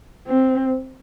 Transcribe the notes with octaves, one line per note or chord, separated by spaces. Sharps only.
C4